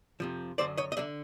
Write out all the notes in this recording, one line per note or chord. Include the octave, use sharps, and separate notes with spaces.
F2 C3 F3
F#2 D3 F#3 C5 D5
C#5 D#5
D#5
D3 F#3 D5 E5